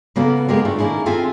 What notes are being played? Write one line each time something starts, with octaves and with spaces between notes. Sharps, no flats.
C#3 A#3 B3 F#4 A4
G#3 A#3 B3 G4 G#4 A#4
A3 D4 F4
D#3 A#3 C#4 E4 G#4
C4 F4 G#4 A4 E5 G#5